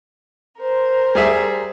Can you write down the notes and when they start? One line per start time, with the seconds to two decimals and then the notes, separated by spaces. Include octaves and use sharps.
0.59 A#4 C5
1.15 G3 G#4 E5